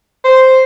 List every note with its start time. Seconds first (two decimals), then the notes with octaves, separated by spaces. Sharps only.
0.25 C5